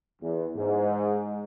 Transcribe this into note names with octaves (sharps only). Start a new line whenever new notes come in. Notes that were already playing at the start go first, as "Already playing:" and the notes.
E2
G#2